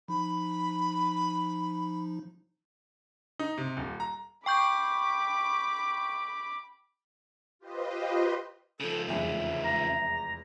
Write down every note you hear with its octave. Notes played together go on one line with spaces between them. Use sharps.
F3 D#4 B5
D#4
C3
D#1
A#5
G5 B5 C#6 D6 G6
F4 G4 B4 C5 D#5
C#3 F3 A4
F1 E2 G#3 E5
A#5